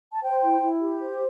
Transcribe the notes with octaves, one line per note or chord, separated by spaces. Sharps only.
A5
C5 G5
E4
E4
G4
C5